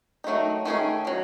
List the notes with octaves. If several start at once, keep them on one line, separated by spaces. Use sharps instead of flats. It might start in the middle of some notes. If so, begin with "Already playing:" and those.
D#3 F#3 A3 D#4
D#3 A3 C#4 G#4
D#3 F#3